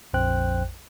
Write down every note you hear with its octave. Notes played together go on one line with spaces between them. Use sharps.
A#1 F2 C5 G5 F#6